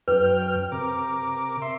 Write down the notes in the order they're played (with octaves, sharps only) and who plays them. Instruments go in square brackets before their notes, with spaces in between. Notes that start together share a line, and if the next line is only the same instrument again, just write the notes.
[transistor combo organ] F#2 G5 F6 [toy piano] B4
[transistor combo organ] C3 A#4 D6
E5 C6